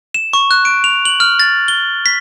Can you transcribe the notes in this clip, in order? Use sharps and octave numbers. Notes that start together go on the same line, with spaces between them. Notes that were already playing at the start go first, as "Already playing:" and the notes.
E7
C#6
F#6
D7
F7
F#7
F6
A6
G7
B6